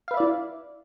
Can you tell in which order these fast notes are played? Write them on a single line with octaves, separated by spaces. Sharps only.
F5 B4 E5 D5 E4